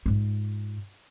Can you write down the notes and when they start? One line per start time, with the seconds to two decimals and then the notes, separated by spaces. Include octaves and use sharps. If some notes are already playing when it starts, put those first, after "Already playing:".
0.06 G#2 F4